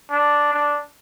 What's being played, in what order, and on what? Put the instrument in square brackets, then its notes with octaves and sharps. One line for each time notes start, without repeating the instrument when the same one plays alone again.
[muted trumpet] D4
D4